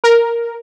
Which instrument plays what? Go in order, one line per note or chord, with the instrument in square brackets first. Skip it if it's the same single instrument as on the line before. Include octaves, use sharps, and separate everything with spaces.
[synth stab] A#4